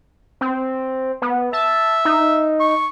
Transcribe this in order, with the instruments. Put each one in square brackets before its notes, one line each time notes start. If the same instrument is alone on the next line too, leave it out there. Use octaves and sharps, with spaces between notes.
[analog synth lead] C4
B3
[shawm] E5 [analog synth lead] A5
[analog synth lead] D#4
[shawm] C#6